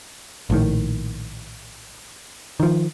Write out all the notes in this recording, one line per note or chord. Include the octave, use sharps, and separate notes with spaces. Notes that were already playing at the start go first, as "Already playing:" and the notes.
A#1 A2 D#3
D#3 F3